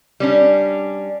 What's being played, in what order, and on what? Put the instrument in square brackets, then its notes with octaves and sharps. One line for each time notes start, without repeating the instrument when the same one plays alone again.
[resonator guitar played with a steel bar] G3 C#4 D4